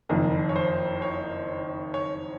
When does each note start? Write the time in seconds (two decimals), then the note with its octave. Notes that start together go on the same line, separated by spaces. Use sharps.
0.09 F#1 F2 D#3 A#4
0.49 C#5
0.56 C5
1.02 C#5
1.94 C#5